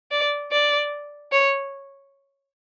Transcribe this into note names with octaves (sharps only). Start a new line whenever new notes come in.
D5
D5
C#5